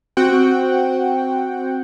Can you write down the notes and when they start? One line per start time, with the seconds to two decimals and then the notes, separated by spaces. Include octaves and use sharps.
0.17 C4 F#4 F#5 G5